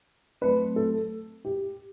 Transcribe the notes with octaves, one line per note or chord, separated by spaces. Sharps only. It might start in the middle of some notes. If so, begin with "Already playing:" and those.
F#3 A3 C4 B4
A4
G4